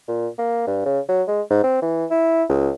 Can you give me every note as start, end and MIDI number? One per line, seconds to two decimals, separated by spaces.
0.08 0.28 46
0.38 0.67 58
0.67 0.84 43
0.86 1.00 49
1.09 1.23 54
1.28 1.42 56
1.50 1.63 44
1.64 1.81 60
1.82 2.06 52
2.11 2.44 64
2.49 2.70 37